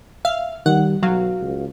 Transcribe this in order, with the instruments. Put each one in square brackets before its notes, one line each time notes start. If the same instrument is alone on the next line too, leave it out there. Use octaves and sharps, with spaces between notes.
[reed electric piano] E5 [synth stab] F5
[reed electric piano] D#3 [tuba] G3 [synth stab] F#5
[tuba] B1 [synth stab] F#3 [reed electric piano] F#4 F5
[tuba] C#2